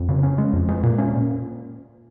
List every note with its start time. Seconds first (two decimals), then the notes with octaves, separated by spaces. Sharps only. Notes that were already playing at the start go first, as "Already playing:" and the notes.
Already playing: F2
0.09 C#3
0.23 C#4
0.38 G#3
0.53 F2
0.69 G#3
0.83 A#2
0.98 C#4
1.13 A#2